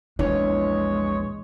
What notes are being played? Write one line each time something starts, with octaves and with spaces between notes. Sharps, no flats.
A#1 E2 E3 G#3 D4 C#5